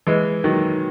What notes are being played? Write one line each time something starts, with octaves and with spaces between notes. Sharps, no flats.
E3 G#3
D#3 F#3